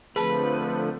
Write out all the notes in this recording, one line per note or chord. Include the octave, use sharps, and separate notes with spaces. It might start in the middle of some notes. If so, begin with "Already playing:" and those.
D3 F3 A3 C4 G#4 B4 A5